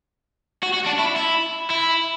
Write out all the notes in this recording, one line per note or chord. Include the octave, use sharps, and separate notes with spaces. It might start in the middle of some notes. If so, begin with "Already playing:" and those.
F#4
F#4
D4
E4
E4
E4